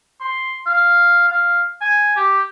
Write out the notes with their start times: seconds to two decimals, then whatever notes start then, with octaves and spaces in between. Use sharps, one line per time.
0.21 C6
0.66 F5
1.28 F5
1.81 G#5
2.16 G4